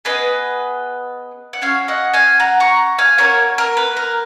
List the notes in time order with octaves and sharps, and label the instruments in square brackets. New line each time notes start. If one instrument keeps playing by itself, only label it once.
[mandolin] B3 F4 G#4 B4 D#5
F#5
C#4 F#4 C#5 F5
D#5 F#5
F5 G#5
F#5 A#5
A#5 C#6
F5 G#5
C#4 F#4 A#4 C#5
A#3
A#4
B4
A#4